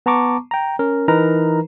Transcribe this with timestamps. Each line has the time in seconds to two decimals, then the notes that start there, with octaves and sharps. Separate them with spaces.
0.06 B3 A5 A#5 C#6 D6
0.51 G5 A#5
0.79 C#4 A#4
1.08 E3 D#4 A#4 B4 A#5